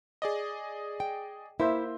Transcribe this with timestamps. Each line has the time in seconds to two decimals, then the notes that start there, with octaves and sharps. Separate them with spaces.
0.22 G#4 D5 D#5
1.00 G5
1.60 A#3 E4 C5 E5